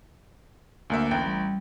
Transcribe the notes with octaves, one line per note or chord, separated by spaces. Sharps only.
D2 A#3 E5
A1 G5
G3